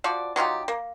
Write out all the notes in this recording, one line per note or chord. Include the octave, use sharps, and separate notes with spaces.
F3 F#4 D5
F#3 D#4 F4 G4
A#3